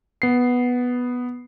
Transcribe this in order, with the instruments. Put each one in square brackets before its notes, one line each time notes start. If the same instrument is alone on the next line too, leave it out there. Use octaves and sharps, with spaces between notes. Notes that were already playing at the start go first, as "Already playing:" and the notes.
[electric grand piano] B3 C7